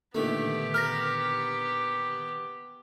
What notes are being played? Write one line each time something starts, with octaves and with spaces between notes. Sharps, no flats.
A#2 D3 D#3 A3 B3 G4
A#4 F6 A#6